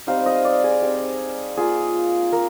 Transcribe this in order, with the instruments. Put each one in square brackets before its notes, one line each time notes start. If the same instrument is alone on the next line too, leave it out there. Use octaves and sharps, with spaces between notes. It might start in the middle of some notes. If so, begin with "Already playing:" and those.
[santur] G3 C4 D#4 F5
D#5
D5
G#4
G3 C4 D#4
A#3 F4 G#4
A#3 A#4